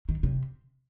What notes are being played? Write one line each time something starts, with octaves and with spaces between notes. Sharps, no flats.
D#3
C3